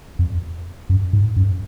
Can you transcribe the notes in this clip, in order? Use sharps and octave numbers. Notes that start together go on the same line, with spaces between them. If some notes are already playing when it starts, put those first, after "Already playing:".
F2
F#2
G#2
F#2